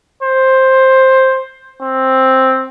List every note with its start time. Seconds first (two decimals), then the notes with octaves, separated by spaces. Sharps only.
0.23 C5
1.82 C4